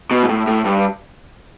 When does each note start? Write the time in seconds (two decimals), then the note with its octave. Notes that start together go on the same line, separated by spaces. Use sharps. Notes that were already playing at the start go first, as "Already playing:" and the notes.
0.11 B2
0.23 G#2
0.29 A2
0.47 A2
0.65 G2